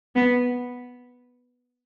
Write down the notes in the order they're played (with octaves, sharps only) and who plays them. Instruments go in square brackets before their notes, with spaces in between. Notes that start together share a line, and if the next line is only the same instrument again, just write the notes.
[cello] B3